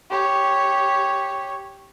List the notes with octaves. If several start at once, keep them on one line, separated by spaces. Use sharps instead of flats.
G4 C#5